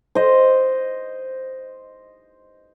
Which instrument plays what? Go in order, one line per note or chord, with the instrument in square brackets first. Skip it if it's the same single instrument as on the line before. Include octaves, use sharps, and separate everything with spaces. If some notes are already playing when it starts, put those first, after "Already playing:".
[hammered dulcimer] C5 D#5